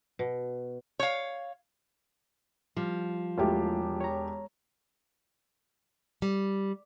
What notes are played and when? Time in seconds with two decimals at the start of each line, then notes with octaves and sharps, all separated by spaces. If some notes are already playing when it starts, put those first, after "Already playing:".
0.19 B2
0.99 C#5 F5
2.76 F3 G3
3.38 E1 A3 E4 F4 G4
4.01 C#5 A#5
6.22 G3